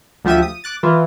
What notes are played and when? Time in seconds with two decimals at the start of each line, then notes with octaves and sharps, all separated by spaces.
0.24 D2 F3 G4 E5 D#7
0.42 D#6
0.64 D6 F#6 A6
0.83 E3 F4